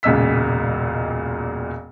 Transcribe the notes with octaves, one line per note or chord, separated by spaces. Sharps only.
E1 C#2 A#2 D#5 E6 B6